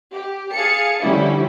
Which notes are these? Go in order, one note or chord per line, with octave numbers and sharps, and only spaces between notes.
G4
G#4 F5 A5 C#7
D3 F3 G3 C#4 E4